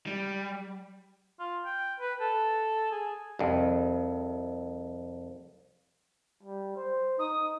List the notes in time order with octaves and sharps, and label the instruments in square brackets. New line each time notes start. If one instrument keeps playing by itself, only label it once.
[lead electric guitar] G3
[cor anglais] F4
G5
B4
A4
G#4
[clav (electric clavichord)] C2 F2
[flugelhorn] G3
C5
[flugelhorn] D#4 [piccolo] D#6